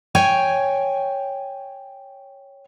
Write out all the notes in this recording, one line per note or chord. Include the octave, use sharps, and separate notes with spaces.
C#5 G5 G#5